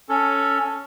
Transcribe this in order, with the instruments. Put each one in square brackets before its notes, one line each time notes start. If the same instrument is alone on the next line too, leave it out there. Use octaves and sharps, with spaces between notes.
[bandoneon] C#4 A4